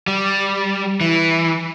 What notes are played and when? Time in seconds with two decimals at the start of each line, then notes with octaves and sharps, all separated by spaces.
0.07 G3
1.01 E3